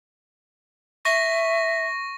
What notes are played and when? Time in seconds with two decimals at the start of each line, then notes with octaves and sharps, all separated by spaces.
1.05 E5 C#6 A#6